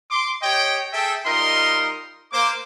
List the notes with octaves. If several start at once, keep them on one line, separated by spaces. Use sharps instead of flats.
C6 D6
G4 C#5 D#5 G5
G#4 A4 E5 G5
G3 D#4 F4 A#4 D#5 C6
A#3 C5 D6